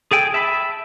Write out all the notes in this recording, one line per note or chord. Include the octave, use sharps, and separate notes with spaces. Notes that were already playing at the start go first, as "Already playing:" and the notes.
G#4 A4 G5 G#5
E5 A5 B5